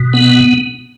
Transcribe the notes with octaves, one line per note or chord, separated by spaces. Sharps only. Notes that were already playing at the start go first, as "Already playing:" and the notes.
Already playing: B2
B3